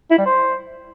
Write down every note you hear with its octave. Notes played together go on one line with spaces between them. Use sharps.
E4
G3
C5